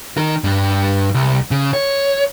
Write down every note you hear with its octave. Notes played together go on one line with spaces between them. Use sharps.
D#3 A#4
G2 D4
C2
C#3
C#5